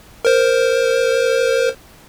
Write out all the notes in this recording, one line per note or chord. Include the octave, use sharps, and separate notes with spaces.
A#4 C5